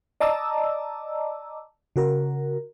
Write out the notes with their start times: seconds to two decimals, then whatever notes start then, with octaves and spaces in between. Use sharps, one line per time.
0.20 D5 D#5 A5 A#5 D6 E6
1.96 C#3 F#4 A#4